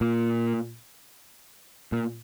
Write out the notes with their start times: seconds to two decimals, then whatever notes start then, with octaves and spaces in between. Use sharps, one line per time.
0.01 A#2
1.92 A#2